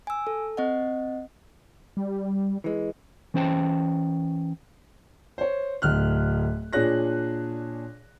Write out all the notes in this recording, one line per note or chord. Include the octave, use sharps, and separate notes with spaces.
G#5 E6
A4
C4 D#5 F#5
G3
E3 G#3
E3 C#4 C5 G5 A5
C5 C#5
D1 D2 F6 F#6
A#2 D4 G#4 C#5 F#6 A#6